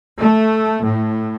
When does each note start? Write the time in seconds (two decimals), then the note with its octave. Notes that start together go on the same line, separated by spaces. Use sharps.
0.19 A3
0.84 A2